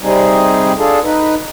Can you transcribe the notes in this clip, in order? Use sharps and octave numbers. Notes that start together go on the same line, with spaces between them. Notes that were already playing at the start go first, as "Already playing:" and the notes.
C3 G3 C4 D#4 G#4
D4 F4 G#4 A4
D#4 B4